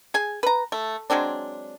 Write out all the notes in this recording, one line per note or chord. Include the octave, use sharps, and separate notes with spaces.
G#4 G#5
B4 A#5
A3
F#3 G#3 C4 D4